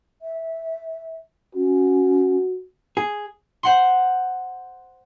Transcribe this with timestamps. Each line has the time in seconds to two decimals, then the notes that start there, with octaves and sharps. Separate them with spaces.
0.22 E5
1.55 C#4 F#4
2.97 G#4
3.63 C5 F#5 C6